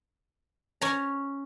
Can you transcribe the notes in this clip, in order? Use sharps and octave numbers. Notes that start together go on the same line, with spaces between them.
C#4 A#5